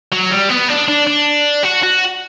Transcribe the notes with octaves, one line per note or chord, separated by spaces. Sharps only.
F#3
G3
B3
D4
D4
D4
F#4
F#4